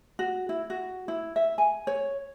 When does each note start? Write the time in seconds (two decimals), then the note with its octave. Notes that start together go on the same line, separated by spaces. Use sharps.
0.19 F#4
0.49 E4
0.70 F#4
1.08 E4
1.36 E5
1.58 G#5
1.87 C#5